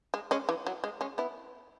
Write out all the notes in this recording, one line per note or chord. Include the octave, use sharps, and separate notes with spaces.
G#3
G#3 C#4
E3
F#3
G#3
G#3 C#4
B3 E4